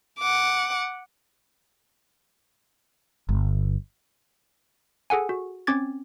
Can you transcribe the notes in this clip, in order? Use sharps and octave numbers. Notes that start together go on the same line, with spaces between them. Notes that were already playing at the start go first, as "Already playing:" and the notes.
F#5 D6
G1
G#4 A4 F#5 G#5
F#4
C4 C#4 D6 G#6 A6